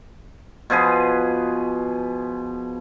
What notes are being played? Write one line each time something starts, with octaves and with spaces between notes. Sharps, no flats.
B2 F3 G#4 B4